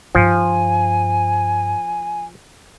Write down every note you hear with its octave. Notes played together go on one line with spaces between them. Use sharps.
G2 F3 D#4 G#5